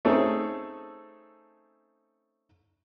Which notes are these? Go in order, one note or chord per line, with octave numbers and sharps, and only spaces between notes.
A3 C4 C#4 D#4 G#4 A4